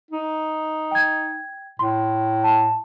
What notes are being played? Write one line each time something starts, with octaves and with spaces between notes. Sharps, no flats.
D#4
G5 G#6
A2 C6
A5